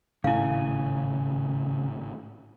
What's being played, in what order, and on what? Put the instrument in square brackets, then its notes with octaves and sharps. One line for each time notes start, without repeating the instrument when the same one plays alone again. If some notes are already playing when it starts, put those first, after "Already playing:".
[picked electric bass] G#1 A2 A3 [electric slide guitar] C#3 G#5 [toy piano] E4 F5